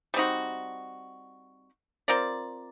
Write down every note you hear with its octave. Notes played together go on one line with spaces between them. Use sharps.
G3 C4 D#4 F#4
C4 F4 A#4 D5